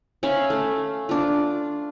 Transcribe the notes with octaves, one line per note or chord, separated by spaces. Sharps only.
C#4 E5 F5 B5
A3
D4 F4